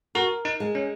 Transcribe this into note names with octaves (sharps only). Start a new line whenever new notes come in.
F#4 A#4
D#4
G#3
C#4